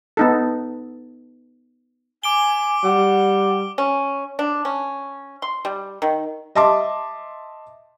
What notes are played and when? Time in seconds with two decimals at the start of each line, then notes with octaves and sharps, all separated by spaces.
0.17 B3 D#4 A4
2.24 G#5 D6 D7 G7
2.84 G3 F#5
3.78 C#4
4.39 D4
4.65 C#4
5.42 C6
5.65 G3
6.02 D#3
6.55 D#5 E5 A5 C6 D6